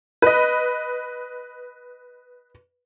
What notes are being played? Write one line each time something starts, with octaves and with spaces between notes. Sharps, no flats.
B4 D#5